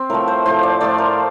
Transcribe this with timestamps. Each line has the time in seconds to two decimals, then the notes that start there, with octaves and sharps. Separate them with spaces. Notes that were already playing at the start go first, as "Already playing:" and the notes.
Already playing: C4
0.10 A2 F3 A3 A#4
0.28 C5
0.46 A2 F3 A3 C5
0.63 D5
0.81 A2 F3 A3 D5
0.98 A#4